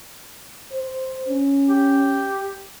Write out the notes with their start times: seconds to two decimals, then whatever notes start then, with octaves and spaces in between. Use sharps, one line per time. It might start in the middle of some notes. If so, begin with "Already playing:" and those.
0.71 C5
1.28 C#4
1.69 G4